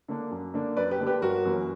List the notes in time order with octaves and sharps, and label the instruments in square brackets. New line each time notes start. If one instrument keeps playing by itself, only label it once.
[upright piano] D3 A#3 D4
F#2
D3 A#3 D4
F#2 B4 D5
G4 B4
D3 A#3 D4
G4 B4
G1 F#4 A#4
F#2 E3 A#3 C#4